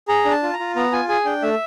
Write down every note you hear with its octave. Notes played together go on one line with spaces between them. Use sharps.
G#4 A#5
D4
A5
F4
A#5
F4
B3 A#5
F4 G#5
G#4 G#5
D4 G5
A3 E5